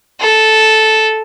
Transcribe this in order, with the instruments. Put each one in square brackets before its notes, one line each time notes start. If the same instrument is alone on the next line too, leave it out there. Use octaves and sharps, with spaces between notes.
[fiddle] A4